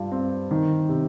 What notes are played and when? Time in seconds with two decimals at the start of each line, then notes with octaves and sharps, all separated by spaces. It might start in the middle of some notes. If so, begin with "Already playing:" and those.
Already playing: G2 F4
0.12 C4
0.51 D#3
0.89 C3